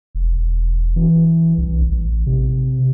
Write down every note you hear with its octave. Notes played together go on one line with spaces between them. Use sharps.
E1
E3
C2
A1
C3